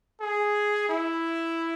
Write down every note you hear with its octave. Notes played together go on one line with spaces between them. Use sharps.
G#4
E4